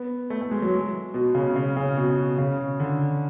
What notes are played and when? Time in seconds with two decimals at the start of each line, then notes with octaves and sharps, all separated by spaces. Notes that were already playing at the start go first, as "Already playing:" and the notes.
Already playing: B3
0.30 A3
0.41 A3
0.51 G#3
0.62 F#3
1.14 B2
1.35 C#3
1.56 C#3
1.76 C#3
1.97 B2
2.38 C#3
2.80 D3